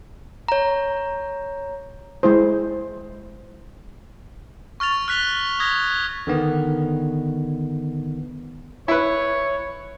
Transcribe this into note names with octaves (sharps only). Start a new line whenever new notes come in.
C#5 A#5
G#3 E4 C5
C#6 F6 A6 F7
F6 F#6 B6 F7 G7
D#6 G#6 A#6 B6
D3 D#3 B3
E4 B4 C#5